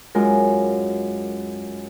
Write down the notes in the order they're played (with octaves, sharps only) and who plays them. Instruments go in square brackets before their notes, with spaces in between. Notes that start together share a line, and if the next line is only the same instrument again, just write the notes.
[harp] F#2 G#3 F4 A#4